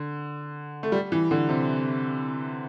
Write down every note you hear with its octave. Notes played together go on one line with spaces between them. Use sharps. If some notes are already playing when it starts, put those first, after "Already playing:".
Already playing: D3
A3
G3
E3
D3
C3